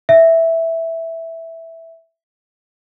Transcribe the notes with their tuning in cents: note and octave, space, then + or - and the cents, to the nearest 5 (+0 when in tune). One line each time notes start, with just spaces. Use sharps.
E5 -5